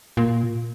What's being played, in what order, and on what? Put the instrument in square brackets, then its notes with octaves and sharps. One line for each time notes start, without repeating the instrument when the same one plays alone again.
[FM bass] A#2